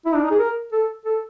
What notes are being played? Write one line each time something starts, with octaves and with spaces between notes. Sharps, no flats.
E4
D4
D#4
G#4
A#4
A4
A4